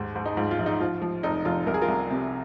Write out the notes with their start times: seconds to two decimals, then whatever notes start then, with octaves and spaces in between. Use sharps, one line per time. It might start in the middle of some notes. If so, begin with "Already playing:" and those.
Already playing: D#2 G#2
0.16 G#2
0.26 D#4
0.37 G#2 F4
0.51 F4
0.59 A#1
0.66 D#4
0.80 F3 F4
1.02 F3
1.23 F1 D#4
1.45 F1 F4
1.66 C2 A#4
1.74 G#4
1.81 F4 A#4
1.88 C2
2.10 C3